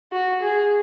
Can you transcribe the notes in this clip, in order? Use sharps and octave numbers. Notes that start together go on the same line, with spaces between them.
F#4
G#4